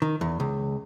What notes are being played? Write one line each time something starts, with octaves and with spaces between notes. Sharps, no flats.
D#3
E2
C#2